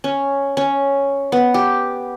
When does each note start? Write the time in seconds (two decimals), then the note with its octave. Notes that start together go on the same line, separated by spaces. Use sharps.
0.04 C#4
0.57 C#4
1.32 B3
1.54 G4